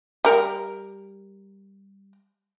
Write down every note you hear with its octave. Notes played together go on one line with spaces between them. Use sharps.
G3 A#4